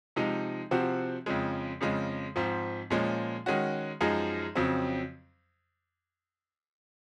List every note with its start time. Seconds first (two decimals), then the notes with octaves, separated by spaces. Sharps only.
0.16 C3 F3 G#3 D#4
0.71 C3 F3 C4 F#4
1.26 F2 C#3 F3 G#3
1.81 F2 C#3 F3 G#3
2.36 G#2 F3 C4
2.91 A#2 F3 G#3 C#4
3.46 D#3 G#3 C#4 F#4
4.01 F#2 F3 G#3 D#4 G#4
4.56 F2 C#3 F#3 C4